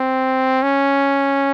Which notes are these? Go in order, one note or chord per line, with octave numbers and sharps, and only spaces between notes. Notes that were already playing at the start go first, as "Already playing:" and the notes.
Already playing: C4
C#4